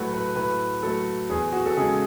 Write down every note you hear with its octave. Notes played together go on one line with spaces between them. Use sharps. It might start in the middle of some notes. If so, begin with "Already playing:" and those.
Already playing: A2 F#3 A3 B4 F#5
B4
A2 B4
F#3 A3 A4
E2 G#4
F#4
A4
C#3 G#3 G#4